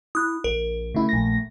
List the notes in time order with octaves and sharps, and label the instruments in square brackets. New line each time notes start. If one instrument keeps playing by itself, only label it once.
[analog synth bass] E4 [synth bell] D#6 F#6
[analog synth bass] A#1 [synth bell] A#4
[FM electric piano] C#3 E4 [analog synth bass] A3
[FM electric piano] A#1 A#6